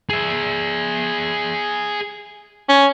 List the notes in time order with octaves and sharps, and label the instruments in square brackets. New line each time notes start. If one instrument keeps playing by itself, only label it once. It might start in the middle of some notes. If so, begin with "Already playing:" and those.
[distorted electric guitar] G#4 E5
[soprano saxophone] C#4